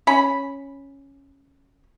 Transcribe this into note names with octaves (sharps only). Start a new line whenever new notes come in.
C#4 B5